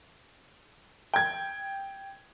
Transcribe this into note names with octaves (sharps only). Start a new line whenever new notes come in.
G5 G#6